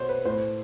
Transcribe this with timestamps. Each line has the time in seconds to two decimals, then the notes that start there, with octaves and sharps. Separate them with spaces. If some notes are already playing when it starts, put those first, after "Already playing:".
Already playing: B2 C5 C#5
0.09 B4
0.25 A2 C5